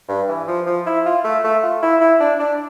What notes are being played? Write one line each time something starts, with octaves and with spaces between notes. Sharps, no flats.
G2
E3
F3
F3
E4
F4
A3
A3
F4
E4
E4
D4
D4